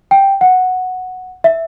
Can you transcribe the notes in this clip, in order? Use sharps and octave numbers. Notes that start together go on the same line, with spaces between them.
G5
F#5
E5